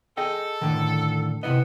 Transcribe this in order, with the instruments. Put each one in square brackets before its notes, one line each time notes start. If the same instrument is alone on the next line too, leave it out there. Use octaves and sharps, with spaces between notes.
[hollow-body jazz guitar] G#4 D#5 G5 [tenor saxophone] A4
[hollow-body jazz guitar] A2 D3 D#3
[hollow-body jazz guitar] C3 E4 D#5 [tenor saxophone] B3